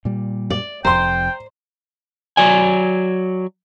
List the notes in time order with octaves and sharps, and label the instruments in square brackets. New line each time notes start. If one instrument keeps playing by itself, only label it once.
[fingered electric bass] A#2 G3
[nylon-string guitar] D5
[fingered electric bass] F1 F2 [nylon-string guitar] C5 [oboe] G5 [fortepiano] A#5 C6
[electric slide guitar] F#3 D5 G#5